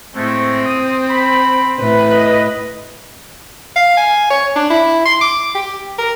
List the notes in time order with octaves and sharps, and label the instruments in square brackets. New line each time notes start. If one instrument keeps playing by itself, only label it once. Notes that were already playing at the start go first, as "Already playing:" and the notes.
[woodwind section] A2 G#3 A3 [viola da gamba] C4
[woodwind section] D#6
B5
[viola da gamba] A2 B4
[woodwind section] D#5
[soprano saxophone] F5
G#5
C#5
D4
E4
C6
D6
G4
A#4